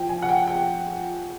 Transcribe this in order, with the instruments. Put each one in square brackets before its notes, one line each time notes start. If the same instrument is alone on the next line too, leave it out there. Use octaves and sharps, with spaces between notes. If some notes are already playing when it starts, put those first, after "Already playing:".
Already playing: [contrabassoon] F3 [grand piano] G5
[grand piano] G#5
F#5
G5
G5